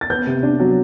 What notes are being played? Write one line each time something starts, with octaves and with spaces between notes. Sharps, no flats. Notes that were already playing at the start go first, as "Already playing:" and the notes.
A6
B3 G6
C3
D4
F#3